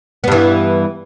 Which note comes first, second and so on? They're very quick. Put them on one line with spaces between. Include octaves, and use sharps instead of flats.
B3 G2 E3